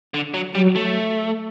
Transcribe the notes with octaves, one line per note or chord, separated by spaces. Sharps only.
D3
F#3
F#3 G3
A3